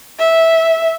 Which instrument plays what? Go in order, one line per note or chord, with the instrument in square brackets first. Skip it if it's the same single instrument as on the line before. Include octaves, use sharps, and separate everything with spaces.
[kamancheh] E5